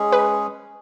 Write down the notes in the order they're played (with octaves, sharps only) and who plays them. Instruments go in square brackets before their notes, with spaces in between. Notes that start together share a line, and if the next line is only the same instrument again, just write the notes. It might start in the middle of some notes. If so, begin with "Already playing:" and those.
Already playing: [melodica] G#3 C#4 G#4
[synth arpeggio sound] B4